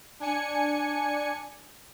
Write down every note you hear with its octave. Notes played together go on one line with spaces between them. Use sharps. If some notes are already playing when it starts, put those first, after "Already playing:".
D4 G#5 C#7